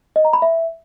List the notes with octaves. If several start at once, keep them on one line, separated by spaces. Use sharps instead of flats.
D#5
A#5
B5
E5